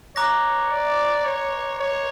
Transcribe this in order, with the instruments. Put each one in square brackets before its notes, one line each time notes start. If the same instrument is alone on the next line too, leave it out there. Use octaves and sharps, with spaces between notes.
[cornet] C#5 [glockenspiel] A#5 D6 F#6 A#6
[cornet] D5
C#5
C#5